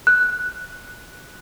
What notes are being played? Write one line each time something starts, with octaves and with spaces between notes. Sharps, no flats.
F#6